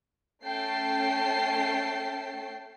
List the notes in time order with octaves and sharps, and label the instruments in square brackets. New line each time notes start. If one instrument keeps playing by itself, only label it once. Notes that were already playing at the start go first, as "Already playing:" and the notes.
[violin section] A3 C#4 G5 A5 C7